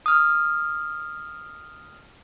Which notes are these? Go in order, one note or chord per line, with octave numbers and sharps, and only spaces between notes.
D#6 F6